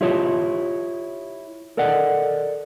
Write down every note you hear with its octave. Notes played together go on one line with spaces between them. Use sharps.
E4 F4 G4 C#5 D#5 A5
A4 A#4 D5 D#5 F#5